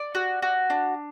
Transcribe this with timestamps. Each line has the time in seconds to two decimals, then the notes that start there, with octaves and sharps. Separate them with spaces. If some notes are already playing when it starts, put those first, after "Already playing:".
Already playing: D5
0.15 F#4
0.42 F#4
0.70 D4